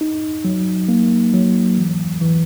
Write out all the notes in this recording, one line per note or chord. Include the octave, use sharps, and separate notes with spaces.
D#4
F#3
A#3
F#3
E3
E3